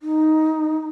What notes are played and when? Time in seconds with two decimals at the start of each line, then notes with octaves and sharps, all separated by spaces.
0.01 D#4